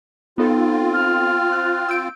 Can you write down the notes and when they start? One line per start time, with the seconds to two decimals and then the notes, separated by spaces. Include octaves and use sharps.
0.38 B3 C4 D#4 F4 A4
0.93 F6
1.52 F#6 A6
1.88 E6 G6 D7